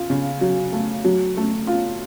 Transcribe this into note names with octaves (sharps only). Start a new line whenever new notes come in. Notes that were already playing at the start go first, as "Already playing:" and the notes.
Already playing: F4
C#3
F#3
A3
F#3
A3
F4